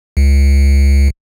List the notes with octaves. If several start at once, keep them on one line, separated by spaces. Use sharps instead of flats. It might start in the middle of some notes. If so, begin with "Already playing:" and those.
C#2